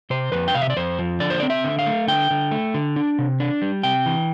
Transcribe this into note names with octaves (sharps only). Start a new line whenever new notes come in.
C3 C5
F2 B4
G5
C3 F5
E5
D5
F2 C5
F3
D3 D5
C5
C4 D5
E5
D3
F5
A3
D3 G5
D3
A3
D3
D4
C3
D4
G3
C3 G5
E3